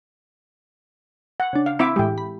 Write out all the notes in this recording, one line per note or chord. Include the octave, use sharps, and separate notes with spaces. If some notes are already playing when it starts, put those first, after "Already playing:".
F#5
C#3 D4
F5
C4 E4 E5 D6 B6
A2 E3 G#3 G4 G5
B5